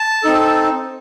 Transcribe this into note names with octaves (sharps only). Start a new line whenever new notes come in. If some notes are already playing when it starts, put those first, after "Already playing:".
Already playing: A5
C4 D#4 A4